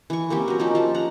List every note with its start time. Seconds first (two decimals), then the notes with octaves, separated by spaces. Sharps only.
0.10 E3 C#6
0.30 A#3 C4 C#4 G4
0.48 F#3 A#4
0.60 F3 C#4 D#4 G4
0.75 F3 A5
0.94 F#5 A#5